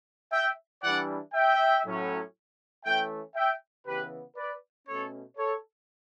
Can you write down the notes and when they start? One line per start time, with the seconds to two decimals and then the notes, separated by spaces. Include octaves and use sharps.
0.33 E5 G5
0.83 E3 G3 D4 D5 F#5
1.34 E5 G5
1.85 A2 F#3 C#4
2.85 E3 A3 C#4 E5 G5
3.35 E5 G5
3.86 C#3 E3 B3 G4 B4
4.36 B4 D5
4.87 B2 A3 C#4 A4 C#5
5.37 A4 C#5